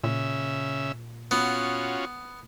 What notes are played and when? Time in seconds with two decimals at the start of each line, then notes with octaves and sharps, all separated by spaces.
0.04 A#2 C#3 E5
1.31 B3 C#4 F4 F#4